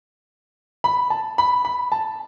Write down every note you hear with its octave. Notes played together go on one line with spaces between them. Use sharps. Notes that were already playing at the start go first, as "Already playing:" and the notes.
B5
A5
B5
B5
A5